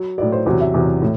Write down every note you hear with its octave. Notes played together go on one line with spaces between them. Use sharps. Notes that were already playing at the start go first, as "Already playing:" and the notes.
Already playing: F#3
A2 F#3 D5
C5
E2 C3 F#3 C5
E5
E2 C3 F#3
A2